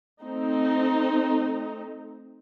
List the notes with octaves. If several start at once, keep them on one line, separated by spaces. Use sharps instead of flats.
A3 C4 D#4